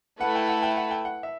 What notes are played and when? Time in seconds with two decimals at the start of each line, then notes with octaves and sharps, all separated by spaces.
0.20 A3 E4 B4 F#5
0.35 G5
0.49 F#5
0.63 G5
0.77 F#5
0.91 G5
1.05 F#5
1.23 E5